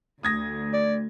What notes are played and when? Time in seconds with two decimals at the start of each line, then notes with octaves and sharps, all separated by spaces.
0.23 D2 D#6 G#6 A#6
0.74 D5